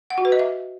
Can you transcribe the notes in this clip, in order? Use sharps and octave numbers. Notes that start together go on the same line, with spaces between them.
F#5
F#4
B4
D#5
E5